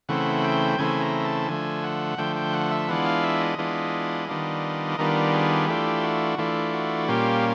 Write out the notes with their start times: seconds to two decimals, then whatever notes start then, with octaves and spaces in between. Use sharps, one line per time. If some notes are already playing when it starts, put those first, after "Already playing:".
0.09 C#3 E3 A3 C4 F#5
0.44 G5
0.78 C#3 E3 A3 C4 G#5
1.02 A#5
1.25 A5
1.48 D3 F3 A3 G#5
1.84 F#5
2.18 D3 F3 A3 G5
2.36 G5
2.53 F#5
2.71 E5
2.88 E3 G#3 B3 D4 F4 F#5
3.06 F5
3.23 E5
3.41 D#5
3.58 E3 G#3 B3 D4 F4
4.28 D#3 G3 B3 D4 F4
4.99 D#3 G3 B3 D4 F4 A#4
5.34 G#4
5.68 E3 A3 D4 F4 G4
6.03 F#4
6.38 E3 A3 D4 F4
6.73 F#4
7.08 A#2 G3 A#3 C#4 F4 G4